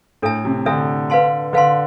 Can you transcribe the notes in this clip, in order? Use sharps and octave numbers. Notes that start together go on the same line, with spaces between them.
A2 D4 A4 E5 A5
C3
D3 D4 A4 E5 A5
B4 F5 A5 C6
D3 B4 F5 A5 C6